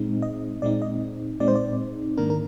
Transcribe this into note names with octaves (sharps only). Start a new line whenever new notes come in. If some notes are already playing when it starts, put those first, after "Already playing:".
Already playing: A#2 G#3 C4 D#4
D#5
A#2 G#3 C4 D#4 D5
D#5
A#2 G#3 C4 D#4 D5
C5
D5
G#2 D#3 A#3 D4 A#4
A#4